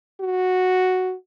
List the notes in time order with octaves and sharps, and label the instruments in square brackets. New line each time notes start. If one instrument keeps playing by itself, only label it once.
[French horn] F#4